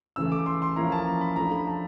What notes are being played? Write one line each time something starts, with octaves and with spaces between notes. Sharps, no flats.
C#3 E3 A3 E6
D6
C6
C6
F3 A#3 C#4 E4 A#5
A5
A#5
B5
F3 A3 D4 A#5
B5
A5